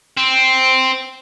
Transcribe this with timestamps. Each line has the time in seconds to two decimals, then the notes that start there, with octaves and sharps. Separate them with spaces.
0.17 C4